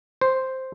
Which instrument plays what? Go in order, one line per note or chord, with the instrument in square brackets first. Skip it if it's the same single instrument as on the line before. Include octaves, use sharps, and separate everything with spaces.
[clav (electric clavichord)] C5